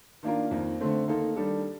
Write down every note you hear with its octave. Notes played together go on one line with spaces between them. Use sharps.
D#3 A#3 D4 F4 A#4
F2 D#3 A#3
D3 A3 C4
D#3 A#3 D#4 A4
D#3 G3 D4 A4